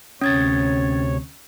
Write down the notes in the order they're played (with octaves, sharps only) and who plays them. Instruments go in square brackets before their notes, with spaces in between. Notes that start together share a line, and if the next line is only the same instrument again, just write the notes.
[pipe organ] D2 C3 C#5 [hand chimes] C#4 G#6 A6